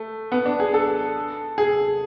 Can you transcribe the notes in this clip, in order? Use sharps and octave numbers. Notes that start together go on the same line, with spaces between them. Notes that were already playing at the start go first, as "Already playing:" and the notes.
Already playing: A3
B3
D4
G#4
A4
G#4